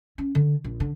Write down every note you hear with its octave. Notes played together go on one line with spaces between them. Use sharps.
C#4
D3
A#1
D3